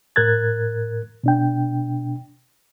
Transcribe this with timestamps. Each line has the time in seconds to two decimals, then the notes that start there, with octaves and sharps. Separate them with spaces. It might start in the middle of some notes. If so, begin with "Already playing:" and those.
0.16 A2 A#4 F#6 G#6 A6
1.24 B2 D4 G5